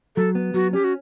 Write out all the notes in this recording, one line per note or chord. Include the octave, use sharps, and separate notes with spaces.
F#3 A4
B3
F#3 F#4
C#4 G4
F#4